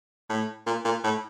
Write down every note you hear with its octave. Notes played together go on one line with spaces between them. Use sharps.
A2
A#2
A#2
A2